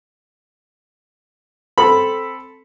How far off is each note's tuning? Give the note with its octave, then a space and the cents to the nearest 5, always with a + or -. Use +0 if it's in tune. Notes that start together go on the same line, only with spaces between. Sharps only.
C4 +0 A4 +0 B5 +0